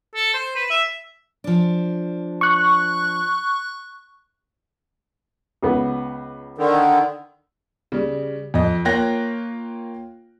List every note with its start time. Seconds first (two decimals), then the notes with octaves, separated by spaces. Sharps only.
0.15 A4
0.34 C5
0.56 B4
0.70 E5
1.44 F3 D4
2.41 C#6 F#6
5.63 C#2 B3
6.58 D3 D#3
7.92 C#3 G3
8.54 F2 D#5
8.85 A#3 F4 C#5 G5 F#6 A#6